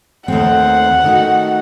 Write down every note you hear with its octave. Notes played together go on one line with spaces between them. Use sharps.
D#2 D#3 A3 C4 F#5
D#3 A3 D#4 F#4